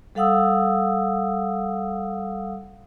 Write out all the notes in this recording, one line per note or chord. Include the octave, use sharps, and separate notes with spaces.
G3 A4 F5 F#5 D#6 E6